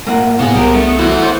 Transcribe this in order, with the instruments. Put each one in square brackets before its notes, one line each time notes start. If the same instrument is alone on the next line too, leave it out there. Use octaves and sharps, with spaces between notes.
[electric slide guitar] A2 A#3 [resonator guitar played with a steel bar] A#4 F#5
[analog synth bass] A2 [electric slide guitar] C3 [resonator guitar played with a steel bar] A#3 G#4 [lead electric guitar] B3
[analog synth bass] C2 [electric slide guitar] G3 G4 A#4
[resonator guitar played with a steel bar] G2 [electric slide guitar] A3
[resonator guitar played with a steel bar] E3 F#4 C5 [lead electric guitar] E4 F#5
[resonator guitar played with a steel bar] B3 C5